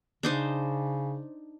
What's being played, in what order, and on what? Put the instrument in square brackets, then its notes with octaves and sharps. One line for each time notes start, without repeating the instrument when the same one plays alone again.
[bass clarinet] C#3 [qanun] D4 D#4 C5